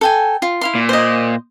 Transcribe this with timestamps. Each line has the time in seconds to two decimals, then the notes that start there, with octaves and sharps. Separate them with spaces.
0.01 A4 G5 G#5
0.42 F4
0.61 E4 F5 C6
0.75 A#2
0.89 C5 D#5